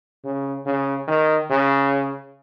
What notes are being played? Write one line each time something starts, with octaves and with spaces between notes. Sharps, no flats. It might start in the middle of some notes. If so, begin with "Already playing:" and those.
C#3
C#3
D#3
C#3